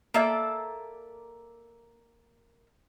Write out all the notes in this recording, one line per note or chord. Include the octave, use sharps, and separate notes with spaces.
A#3 A4 D5 E5